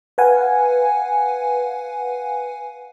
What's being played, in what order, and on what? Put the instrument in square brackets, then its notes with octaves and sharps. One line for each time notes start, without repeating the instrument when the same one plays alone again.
[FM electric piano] B4 F5 F#5 G#5